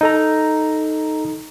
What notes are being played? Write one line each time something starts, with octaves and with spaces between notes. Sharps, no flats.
D#4 A4 A#5